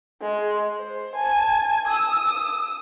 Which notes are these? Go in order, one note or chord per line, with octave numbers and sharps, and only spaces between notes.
G#3
C5
G#5 A5
D#6 E6